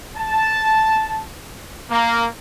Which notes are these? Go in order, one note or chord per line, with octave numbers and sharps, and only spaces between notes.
A5
A#3